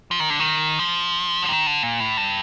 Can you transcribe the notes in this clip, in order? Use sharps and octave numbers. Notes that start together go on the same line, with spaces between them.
F3
D#3
D3
D#3
F3
D3
D#3
D3
A#2
A2
G2